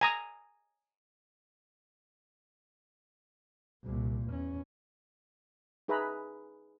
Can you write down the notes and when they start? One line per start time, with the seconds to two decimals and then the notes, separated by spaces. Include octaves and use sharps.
0.01 G#5 A#5 D#6
3.83 C2 A#2
4.29 E2 C#4
5.88 D#4 G#4 B4 E5 A#5 B5